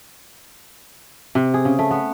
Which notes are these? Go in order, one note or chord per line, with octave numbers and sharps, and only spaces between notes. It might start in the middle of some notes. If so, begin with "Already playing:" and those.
C3
G#4
C#3
A3
B3